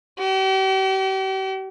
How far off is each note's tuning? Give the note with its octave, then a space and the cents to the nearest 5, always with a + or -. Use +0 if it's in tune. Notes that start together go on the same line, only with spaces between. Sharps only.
G4 -40